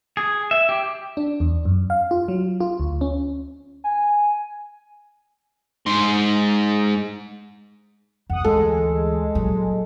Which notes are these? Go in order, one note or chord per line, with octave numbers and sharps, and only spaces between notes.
G#4
E5
G4
D4
E2
F#2
F5
F4
F#3
F4
D2
C#4
G#5
G#2 C6
F2 F#5 D#6
D2 E3 G#3 A4
A#2 F#3